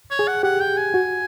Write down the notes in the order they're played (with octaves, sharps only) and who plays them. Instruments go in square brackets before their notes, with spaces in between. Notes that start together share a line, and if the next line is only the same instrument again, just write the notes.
[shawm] C#5
[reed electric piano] G#4
[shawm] F#5
[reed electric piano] G4 [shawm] F#5
[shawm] G5
G#5
[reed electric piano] F#4